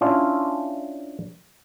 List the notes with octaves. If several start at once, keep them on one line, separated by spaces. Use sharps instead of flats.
C#4 D4 E4 F4